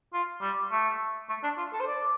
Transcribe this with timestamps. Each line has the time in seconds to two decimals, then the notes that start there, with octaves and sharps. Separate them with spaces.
0.14 F4
0.42 G3
0.72 A3
1.29 A3
1.44 D4
1.58 F4
1.73 A4
1.80 C5
1.87 D5